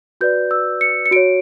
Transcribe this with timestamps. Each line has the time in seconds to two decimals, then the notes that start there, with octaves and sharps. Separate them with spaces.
0.21 F#4 B4 D5 G6
0.51 E6
0.81 C#7
1.06 C#7
1.11 F#4 C#5 D7